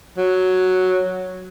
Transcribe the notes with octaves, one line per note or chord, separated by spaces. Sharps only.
F#3